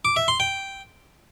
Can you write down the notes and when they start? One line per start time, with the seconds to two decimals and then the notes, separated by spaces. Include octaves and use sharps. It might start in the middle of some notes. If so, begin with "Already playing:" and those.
0.05 D6
0.16 E5
0.28 C6
0.40 G5